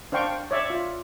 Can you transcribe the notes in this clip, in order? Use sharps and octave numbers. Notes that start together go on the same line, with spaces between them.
D4 C5 F5 G5 C#6
C#5 D5 E5
F4